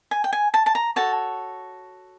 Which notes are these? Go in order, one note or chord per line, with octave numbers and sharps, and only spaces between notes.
G#5
G5
G#5
A5
A5
A#5
F#4 A4 C#5 A5